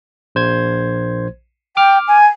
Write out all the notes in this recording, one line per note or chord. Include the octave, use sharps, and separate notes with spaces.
A#1 C5 G#6
G5 D6 F6
G#5